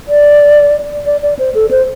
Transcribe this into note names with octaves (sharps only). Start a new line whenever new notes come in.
D5
D5
D5
C5
A4
C5